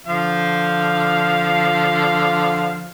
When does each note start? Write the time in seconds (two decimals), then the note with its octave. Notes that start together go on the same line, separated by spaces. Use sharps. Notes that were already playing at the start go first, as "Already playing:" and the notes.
0.07 D3 F3 F5